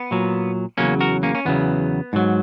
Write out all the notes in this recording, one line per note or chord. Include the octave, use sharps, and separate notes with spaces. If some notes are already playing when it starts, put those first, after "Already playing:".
Already playing: B3
A#2 F#3
E2 C#3 F#3 A#3 C#4
F#4 A#4
A#3 C#4
C#4
E2 C#3 F#3 B3
G#2 F#3